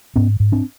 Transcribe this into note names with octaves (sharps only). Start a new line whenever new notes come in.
G#2 B3 C#4
G#2
C4 D4